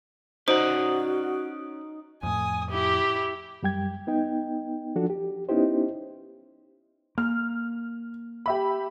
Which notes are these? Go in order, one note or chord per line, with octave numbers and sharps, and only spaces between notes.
C#4 D#4 F#4 C5 D5 F#5
F2 A2 G#5 D#6
E4 G4
F#2 G3 G5 G#6
B3 D#4 G5
F3 D4 F#4 A4
G4
B3 C#4 D#4 E4 G4 C5
A#3 F6
G4 E5 B5